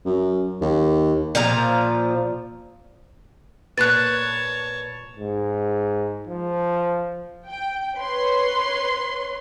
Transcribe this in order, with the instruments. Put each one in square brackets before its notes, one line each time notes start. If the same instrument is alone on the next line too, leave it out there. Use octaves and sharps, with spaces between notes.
[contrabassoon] F#2
D#2
[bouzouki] A#2 F3 F5 A#5
[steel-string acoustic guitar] A#2 B4 [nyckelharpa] C#5 A5 [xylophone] F#6 A6
[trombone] G#2
F3
[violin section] G5
B4 C#5 C6